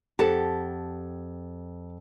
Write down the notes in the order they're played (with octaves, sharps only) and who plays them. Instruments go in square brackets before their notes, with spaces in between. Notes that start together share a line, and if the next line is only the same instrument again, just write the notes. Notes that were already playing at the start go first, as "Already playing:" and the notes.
[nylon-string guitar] F2 G4 [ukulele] A4 F#5 A5